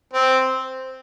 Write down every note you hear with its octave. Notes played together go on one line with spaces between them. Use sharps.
C4